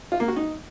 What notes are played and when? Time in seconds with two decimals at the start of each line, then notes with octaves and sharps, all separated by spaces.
0.12 F4
0.20 A#3
0.28 F#4
0.36 D#4